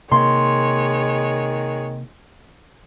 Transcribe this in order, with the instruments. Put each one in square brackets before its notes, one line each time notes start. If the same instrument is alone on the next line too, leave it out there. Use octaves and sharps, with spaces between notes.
[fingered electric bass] C3 A#3 [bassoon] D#3 [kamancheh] G#3 C#5 [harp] C6